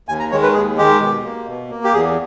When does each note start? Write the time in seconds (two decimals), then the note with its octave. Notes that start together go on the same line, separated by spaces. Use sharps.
0.08 D#2 G#5
0.19 A#5
0.32 D#3 G#3 C#5
0.43 B4
0.54 D#2 G#4
0.77 D#3 G#3 G4
1.01 B2
1.24 A#3
1.48 B2
1.70 A#3
1.84 G4
1.94 E2 G#4